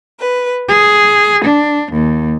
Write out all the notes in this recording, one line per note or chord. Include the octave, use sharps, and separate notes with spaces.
B4
G#4
D4
D#2